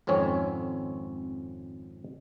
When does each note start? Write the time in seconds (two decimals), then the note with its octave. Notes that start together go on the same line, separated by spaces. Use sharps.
0.07 G#1 F2 C4 C#4 C#5